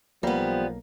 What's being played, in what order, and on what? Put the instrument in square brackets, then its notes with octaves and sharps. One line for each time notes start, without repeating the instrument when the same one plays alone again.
[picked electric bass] B1 A#3 [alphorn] F3 [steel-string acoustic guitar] G3 B3